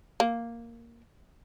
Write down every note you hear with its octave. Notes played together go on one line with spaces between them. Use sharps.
A#3